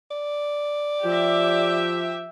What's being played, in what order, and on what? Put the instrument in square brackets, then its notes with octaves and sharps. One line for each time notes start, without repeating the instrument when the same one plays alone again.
[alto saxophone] D5
[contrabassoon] F3 [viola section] G4 E5